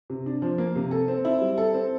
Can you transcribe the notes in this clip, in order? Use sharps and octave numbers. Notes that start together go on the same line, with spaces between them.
C3
D4
F3
A#3
C3
A4
C4
E4
G3
A4
C4